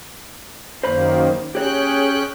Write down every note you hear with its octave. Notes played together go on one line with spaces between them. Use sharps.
F#2 D#3 A#3 C5 A#5 B5
C#4 G4 G#4 C#5 G5 F#6